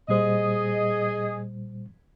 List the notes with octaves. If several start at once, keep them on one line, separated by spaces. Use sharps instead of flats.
A#2 G3 G#4 C5 D#5